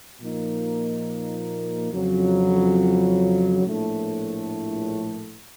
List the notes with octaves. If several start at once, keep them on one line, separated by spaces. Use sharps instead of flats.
A#2 F3 A#3 D#4
F2 C#3 F#3
A#1 A2 A3